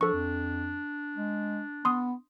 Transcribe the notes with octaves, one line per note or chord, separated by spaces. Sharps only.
F3 D4 A4 C#6
F2
G#3
B3 C6 D#6